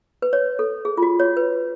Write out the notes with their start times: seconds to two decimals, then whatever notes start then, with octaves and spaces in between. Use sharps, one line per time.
0.22 B4
0.33 C#5
0.59 A4
0.85 G#4
0.97 F4
1.02 F#4
1.20 C#5
1.37 B4